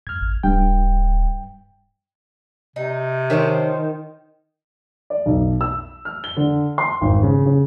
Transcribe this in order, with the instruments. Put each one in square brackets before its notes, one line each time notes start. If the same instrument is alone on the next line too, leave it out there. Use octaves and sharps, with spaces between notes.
[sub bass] F#2 [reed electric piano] F6 G#6
[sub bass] G#1
[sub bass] D1 [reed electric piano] G2 G5
[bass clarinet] C3 [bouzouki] D#4
[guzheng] D#3 [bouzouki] F3 C#4 C5
[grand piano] D5
B1
E6
F6
G7
D3
C6
G#1
C#3
C#3